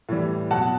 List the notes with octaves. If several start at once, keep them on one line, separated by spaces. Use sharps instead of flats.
A2 E3 G3
B2 F#3 F#5 A5